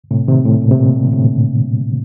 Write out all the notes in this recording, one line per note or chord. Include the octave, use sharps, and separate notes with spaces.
A2 C3
C3 D#3
A2
A#2
C3
A#2
A#2
D3
A2 C3